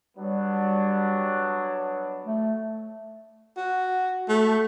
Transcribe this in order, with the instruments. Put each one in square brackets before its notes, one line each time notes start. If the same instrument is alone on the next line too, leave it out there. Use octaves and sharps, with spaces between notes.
[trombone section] F#3 B3 D4 [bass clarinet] G3
[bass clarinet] A3
[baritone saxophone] F#4
A3